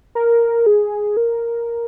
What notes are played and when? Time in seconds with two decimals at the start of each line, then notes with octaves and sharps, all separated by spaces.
0.15 A#4
0.66 G#4
1.17 A#4